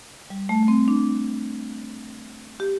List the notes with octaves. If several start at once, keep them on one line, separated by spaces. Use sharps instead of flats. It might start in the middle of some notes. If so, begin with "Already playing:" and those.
G3
A3
A3
C4
D4
G4